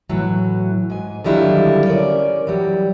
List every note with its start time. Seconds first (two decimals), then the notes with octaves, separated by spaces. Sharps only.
0.09 A2 E3 F#3
0.90 G#2 G#5
1.24 D3 D#3 F#3 G3 E4 F4
1.86 C#4 A#4 D5
2.47 E3 F#3 G3